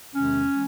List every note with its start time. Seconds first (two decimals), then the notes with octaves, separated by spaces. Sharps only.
0.14 E2 C3 D#3 G#3 C#4
0.51 E3 G#3